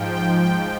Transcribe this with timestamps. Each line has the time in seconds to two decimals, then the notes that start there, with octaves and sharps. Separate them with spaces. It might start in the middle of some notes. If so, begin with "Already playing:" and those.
Already playing: G#2 F3 G5
0.16 G5
0.44 G5